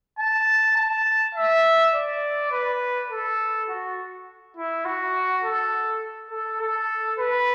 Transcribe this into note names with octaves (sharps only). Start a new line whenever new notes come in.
A5
A5
E5
D5
B4
A4
F#4
E4
F#4
A4
A4
A4
B4